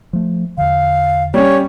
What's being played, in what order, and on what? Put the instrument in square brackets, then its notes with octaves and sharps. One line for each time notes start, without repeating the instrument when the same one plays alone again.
[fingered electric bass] F3 A3
[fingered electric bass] E2 D3 [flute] F5
[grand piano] G3 C#4 [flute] C#5